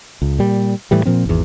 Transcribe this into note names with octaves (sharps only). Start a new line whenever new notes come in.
C#2
A#2 G3
A2 E3 G3
A#2 F3 C4
G#1 E2